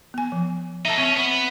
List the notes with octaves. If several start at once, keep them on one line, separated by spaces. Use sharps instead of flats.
B3 G#5
F3
D#4 A4 E5 A5
C4 C#4 E5
B3